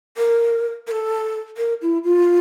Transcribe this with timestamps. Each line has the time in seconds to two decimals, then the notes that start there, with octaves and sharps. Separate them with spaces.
0.17 A#4
0.87 A#4
0.91 A4
1.57 A#4
1.82 E4
2.04 F4